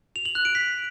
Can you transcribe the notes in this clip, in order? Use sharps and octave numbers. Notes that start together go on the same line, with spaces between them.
F7
F#7
F#6
D7
B6